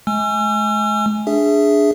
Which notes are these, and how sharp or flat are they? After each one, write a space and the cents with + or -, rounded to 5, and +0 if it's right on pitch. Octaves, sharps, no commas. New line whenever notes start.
G#3 +45 G#5 +0 E6 +45
D4 +0 G#4 +0 E5 +0